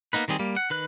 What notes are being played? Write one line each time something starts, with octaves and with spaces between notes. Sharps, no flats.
A#3 B3 D#4 B4
D#3 G3 C4 G#4
G3 A#3
F#5
D#3 B4 F#6